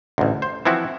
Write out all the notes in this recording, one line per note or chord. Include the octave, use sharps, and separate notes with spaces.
A1 D2
C5
E3 F3 C4 E4 F#4